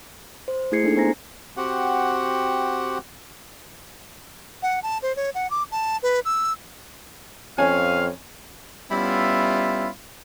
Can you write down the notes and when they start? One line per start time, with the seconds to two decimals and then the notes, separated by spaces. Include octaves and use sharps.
0.48 C5
0.72 A3 E4 G#4 G#6 C7 C#7
0.84 A#3 D4 D#4 A4
0.97 B3 C5 G#5 A#5 A#6
1.57 C4 F#4 G4 F#5
4.62 F#5
4.83 A5
5.02 C5
5.16 C#5
5.35 F#5
5.50 D6
5.72 A5
6.03 B4
6.25 E6
7.58 F2 C#4 F5 G#5
8.91 G3 B3 C#4 E4 F4 E5